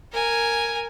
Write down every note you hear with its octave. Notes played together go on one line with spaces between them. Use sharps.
A#4 G#5